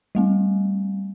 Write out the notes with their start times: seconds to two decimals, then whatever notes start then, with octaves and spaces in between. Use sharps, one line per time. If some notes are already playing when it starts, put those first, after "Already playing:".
0.15 G3 A3 C4